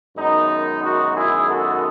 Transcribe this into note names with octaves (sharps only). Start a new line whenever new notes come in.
F#2 D#3 G#3 B3 D#4
D#4 F#4
E4 G#4
F#4 A4